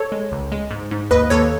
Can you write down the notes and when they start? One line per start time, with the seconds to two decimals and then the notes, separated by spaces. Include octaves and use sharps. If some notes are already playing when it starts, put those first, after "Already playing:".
Already playing: A4 C#5
0.12 G#3
0.32 C#2
0.52 G#3
0.71 G#2
0.91 G#2
1.11 D#2 B4 D#5
1.30 D#2 A4 C#5